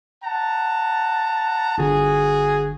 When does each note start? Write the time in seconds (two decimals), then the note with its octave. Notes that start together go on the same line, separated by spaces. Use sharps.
0.23 F#5 A5 A#5
1.78 G1 D3 F#4 G#4